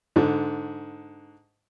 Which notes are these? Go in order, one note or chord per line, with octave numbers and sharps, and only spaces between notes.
G#2 D3